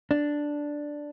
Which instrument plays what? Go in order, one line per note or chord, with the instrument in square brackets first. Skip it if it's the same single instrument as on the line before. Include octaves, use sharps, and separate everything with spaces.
[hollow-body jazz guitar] D4